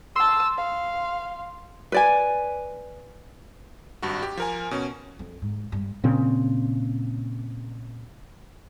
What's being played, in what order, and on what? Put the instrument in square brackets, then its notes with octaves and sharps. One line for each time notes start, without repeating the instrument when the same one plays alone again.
[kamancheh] A5 E6 [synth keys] C6
[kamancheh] F5
[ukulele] B4 D5 G#5
[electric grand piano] G#1 G2 F#4
G4
F3 A#4 G#5
B2 C#4
[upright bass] F2
G#2
G2
[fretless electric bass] A#2 C#3 C4